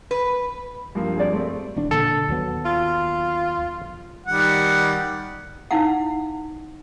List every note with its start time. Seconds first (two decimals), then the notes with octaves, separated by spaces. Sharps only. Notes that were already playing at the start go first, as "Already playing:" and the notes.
0.11 B4
0.95 G2 F3 A#3
1.17 G#4 D5
1.32 G3 A3 C4
1.76 E1 E2 D4
1.91 A#2 D3 A4
2.28 D#2 F#3 B3
2.65 F4
4.27 D#3 G3 F#5
5.71 D#4 E4 F5 F#5